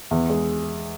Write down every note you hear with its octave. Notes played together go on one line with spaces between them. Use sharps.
E2
G#3